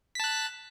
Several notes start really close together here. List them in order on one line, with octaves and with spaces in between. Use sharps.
B6 A5 F#6